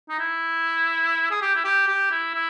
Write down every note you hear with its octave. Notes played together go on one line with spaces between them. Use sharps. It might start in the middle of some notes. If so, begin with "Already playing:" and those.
D#4
E4
G#4
G4
E4
G4
G4
E4
E4